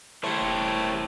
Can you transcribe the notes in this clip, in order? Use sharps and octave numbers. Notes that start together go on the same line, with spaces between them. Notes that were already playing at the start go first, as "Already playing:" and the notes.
A3 E4 G4 C5 C#5
E1